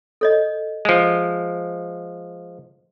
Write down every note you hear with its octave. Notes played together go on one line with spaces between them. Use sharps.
A4 C#5 D#5
F3 G#3